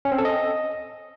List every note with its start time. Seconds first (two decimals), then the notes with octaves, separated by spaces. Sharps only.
0.05 C#4
0.12 C4
0.18 A4
0.25 D#5